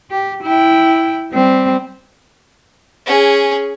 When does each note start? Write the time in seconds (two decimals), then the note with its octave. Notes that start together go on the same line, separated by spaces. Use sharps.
0.11 G4
0.43 E4 G5
1.32 G3 C4
3.06 C#4 G#4